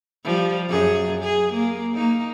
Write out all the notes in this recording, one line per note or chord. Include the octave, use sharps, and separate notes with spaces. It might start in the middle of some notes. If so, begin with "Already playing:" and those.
F3 G3
F#2 G#4
G#4
A#3
A#3 D#4